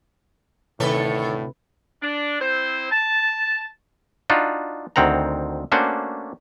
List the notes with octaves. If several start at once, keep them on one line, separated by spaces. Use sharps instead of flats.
D2 A2 C3 D#3 A4 B4 C#5
D4
C4 E4 C5
A5
D4 D#4 F4 F#4
D2 D#3 C4 F#5 A#5
A3 A#3 C#4 D4 F#4 C5